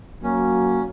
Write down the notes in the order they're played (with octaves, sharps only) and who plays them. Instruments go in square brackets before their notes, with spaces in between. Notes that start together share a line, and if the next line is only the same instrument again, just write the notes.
[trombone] F#3 [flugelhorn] A#3 [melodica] C#4